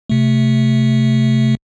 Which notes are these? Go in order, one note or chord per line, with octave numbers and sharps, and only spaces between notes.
C3 A3